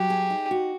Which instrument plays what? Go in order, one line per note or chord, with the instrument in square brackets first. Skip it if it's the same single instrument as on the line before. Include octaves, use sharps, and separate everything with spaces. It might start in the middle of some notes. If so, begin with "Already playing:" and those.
Already playing: [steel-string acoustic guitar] F#3 [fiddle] G4
[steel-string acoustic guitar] G#4
D#4
F#4